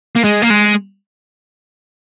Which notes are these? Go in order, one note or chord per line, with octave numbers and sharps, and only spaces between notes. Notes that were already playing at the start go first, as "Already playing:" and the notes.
A#3
G#3
A#3
G#3